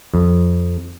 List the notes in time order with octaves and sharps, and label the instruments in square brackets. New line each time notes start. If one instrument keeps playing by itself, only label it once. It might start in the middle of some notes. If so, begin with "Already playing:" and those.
[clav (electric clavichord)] F2